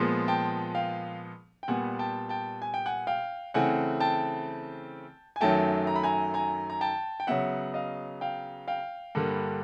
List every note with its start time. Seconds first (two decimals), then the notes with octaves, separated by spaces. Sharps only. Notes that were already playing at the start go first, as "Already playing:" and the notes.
Already playing: A#2 F3 G#3 B3
0.28 G5 A5
0.74 F5 G5
1.63 G5
1.68 A#2 G3 B3 F#5 G#5
1.99 G5 A5
2.29 G5 A5
2.62 G#5
2.74 G5
2.86 F#5 G#5
3.07 F5 G5
3.54 C#3 E3 A3 C4 F#5 G#5
4.00 G5 A5
5.36 G#5
5.41 F#2 D#3 F#3 A3 G5 A5
5.87 A#5
5.96 B5
6.03 G#5 A#5
6.34 G#5 A#5
6.70 A#5
6.81 G5 A5
7.20 G5
7.27 C#3 F#3 B3 E5 F#5
7.74 D#5 F5
8.21 F5 G5
8.68 F5 G5
9.15 G2 D3 G3 A#3